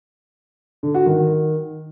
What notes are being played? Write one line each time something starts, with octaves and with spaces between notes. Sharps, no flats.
D3
F#4
D#3